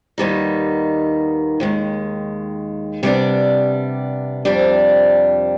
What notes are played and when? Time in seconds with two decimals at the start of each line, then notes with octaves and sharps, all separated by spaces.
0.18 D#2 D#3 G3 B3 D#4
1.60 D#2 D#3 G#3
3.03 C3 G3 B3 D4
4.45 F2 C3 G3 D4